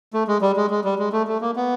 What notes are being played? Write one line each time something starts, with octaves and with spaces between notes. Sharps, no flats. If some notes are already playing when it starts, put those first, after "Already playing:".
A3
G#3
G3
G#3
G#3
G3
G#3
A3
A3
A#3
B3